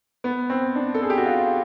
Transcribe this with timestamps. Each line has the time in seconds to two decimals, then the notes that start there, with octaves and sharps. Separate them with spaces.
0.24 B3
0.50 C4
0.75 D4
0.94 A4
1.02 G#4
1.10 G4
1.18 F#4
1.26 F4